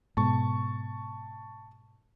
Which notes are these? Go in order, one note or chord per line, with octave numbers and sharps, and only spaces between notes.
G#2 B2 A5 C#6